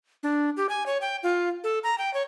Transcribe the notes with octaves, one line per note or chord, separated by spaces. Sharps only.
D4
G4
G#5
C#5
G5
F4
A4
A#5
G5
C#5